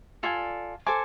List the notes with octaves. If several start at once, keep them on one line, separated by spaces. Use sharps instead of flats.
F4 A4 D5 G#5
A4 C5 G#5 D6